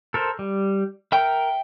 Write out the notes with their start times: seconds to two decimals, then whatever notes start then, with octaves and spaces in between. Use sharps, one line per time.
0.14 A4 A#4 C5
0.39 G3
1.12 A#4 E5 G5